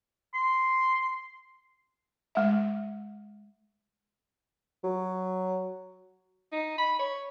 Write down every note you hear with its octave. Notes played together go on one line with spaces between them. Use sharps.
C6
G#3 E5
F#3
D#4
B5
C#5